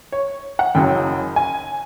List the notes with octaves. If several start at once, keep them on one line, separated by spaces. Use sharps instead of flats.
C#5
F#5
F#1 F#2 C#3 F#3 G5
G#5